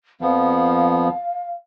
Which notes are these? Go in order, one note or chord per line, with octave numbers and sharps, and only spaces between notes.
F2 F3 B3 F5